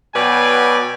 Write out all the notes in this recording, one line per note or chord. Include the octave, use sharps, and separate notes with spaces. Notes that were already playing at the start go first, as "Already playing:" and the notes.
B2 F#3 B4 D5 G5 G#5